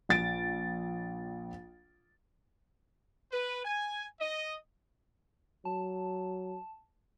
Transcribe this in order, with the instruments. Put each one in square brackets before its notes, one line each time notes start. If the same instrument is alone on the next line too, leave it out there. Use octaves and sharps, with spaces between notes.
[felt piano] A#1 A6 D7
[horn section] B4
G#5
D#5
[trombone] F#3 [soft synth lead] A5